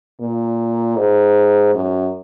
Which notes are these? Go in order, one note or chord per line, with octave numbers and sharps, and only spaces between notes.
A#2
G#2
F#2